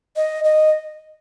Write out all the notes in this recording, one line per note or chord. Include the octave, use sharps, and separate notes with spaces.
D#5
D#5